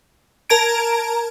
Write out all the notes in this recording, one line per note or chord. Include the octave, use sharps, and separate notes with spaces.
A#4 A5 A#5 G#6 D7